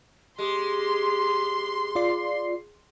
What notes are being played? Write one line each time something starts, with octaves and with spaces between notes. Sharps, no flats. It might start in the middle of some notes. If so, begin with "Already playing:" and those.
G#3 G4 C6
F4 D5 C7